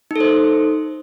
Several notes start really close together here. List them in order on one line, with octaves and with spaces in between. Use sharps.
D#4 A4 C5